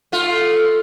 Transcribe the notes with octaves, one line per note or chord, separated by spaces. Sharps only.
A3 F4